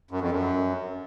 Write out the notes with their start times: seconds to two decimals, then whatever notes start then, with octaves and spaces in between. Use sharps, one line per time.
0.11 F#2
0.21 F2
0.32 F#2